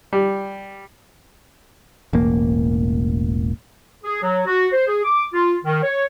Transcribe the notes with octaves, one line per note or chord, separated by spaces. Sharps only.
G3
E1 A1 A#3
G#4
F#3
F#4
C5
G#4
D6
F4
D#3
C#5